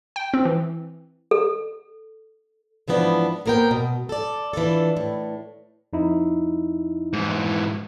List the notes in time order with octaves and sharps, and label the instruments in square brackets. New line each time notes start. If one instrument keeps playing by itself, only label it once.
[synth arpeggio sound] G5
C4
E3
[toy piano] A4
[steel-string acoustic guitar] G#2 E3 F3 B3 C#4 D4
A#3 B3 A#4 C5 G5
B2
A4 D5
E3 D4 F4 A4
A2
[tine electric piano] F2 D#4 E4
[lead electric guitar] G#2 E3